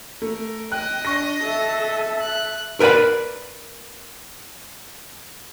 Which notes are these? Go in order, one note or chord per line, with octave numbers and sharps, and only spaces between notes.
A3 A#4
D#5 G5 F#6
D4 C#6 A#6
A4 E5
F#6
A#4 B4 D5 F#5 B5